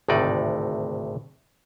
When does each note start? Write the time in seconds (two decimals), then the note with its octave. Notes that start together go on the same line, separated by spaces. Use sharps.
0.08 G#1 D2 A2 C3 D#4 D5